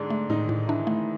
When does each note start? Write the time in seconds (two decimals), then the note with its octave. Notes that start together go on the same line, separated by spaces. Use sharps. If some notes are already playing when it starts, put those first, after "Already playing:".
Already playing: G#2 D3 G#3 D4
0.10 A3
0.29 A2 D#3 D#4
0.49 A2
0.68 E3 D4 E4
0.87 A3